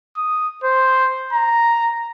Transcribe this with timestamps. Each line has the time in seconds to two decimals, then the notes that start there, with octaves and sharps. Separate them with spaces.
0.17 D#6
0.64 C5
1.33 A#5